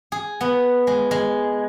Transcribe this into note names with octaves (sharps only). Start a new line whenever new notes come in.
G#4
B3
G#3
G#3